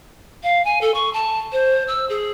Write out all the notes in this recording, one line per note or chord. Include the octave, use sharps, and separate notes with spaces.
F5
G#5
A4
C#6
A5
C5
E6
G#4